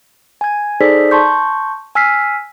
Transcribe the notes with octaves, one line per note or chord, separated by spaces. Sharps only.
G#5 G#6
D#4 G#4 A4 C5 D5 B6
A5 C6 C#6 G6
G#5 E6 F6 B6 C7